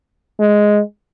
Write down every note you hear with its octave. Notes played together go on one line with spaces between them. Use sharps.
G#3